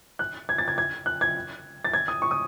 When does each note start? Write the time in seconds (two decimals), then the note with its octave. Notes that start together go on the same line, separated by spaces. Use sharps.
0.19 F#6
0.49 G#6
0.58 A6
0.68 G#6
0.78 G#6
1.06 F#6
1.21 G#6
1.85 A6
1.94 G#6
2.08 D#6
2.22 C#6
2.31 D#6